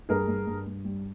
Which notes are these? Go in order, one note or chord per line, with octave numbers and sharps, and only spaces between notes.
G2 G#4 A#4
G2
G2
G2
G3